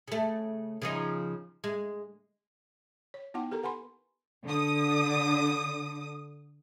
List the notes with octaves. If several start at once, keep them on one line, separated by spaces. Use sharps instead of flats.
C#3 A3
C#3 F3 D#4
G#3
C#5
B3 D#4 E4 F#5 G5
G4 A4 A#4 A#5
B4 F#5 G#5 B5 C6
D3 D#6